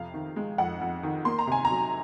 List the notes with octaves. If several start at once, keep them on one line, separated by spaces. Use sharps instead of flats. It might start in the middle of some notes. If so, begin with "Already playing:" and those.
Already playing: F2 C3 F5
D#3
G#3
F2 F#5
F2
D#3
A#3 C6
A#5
C3 G#5
A#5
F#3